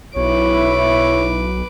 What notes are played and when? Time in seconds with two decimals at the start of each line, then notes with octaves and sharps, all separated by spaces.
0.16 B1 E4 B4 C#5 D6